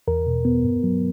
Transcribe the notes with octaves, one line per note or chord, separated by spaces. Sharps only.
E2 A#4
B2
B3
G2
F#3